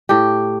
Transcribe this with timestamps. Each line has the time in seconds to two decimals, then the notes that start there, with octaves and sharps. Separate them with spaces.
0.09 A2 G4